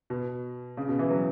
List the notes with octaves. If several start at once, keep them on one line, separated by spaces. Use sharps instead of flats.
B2
C#3
B2
E3
F#3